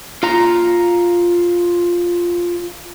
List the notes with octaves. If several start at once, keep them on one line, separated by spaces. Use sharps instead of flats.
F4 A#5